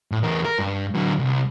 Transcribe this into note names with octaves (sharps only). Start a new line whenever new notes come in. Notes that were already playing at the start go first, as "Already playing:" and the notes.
A2
E2 A#4
A#4
G2
D3 F#3
C2